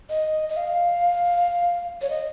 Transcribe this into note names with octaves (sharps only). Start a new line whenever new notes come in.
D#5
D#5
F5
C#5
D#5